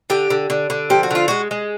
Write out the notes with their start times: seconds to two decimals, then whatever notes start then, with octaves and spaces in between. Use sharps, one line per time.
0.10 D3 G4
0.30 D3
0.50 D3
0.70 D3
0.90 F3 G4
1.03 F#4
1.11 D3 F4
1.28 G#3 F#4
1.51 G#3